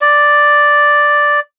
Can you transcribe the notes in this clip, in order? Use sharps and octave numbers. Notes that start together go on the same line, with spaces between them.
D5